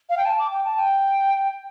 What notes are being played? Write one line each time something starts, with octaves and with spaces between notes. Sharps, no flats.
F5
G5
A5
D6
G5
A5
G5